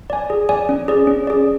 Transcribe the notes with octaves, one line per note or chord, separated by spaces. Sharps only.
D5 G#5
G#4
D5 G#5
C#4
G#4 D5
C#4
G#4 D5